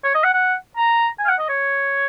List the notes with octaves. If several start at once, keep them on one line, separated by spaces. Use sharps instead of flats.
C#5
D#5
F#5
F#5
A#5
G#5
F5
F#5
D#5
C#5